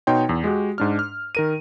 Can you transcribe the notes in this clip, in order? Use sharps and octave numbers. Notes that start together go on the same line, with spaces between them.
B2 D#4 C#5 G5 C6
E2
G#3 F#4 G4
G#2 D4 F6
F6
D#3 A#4 D#7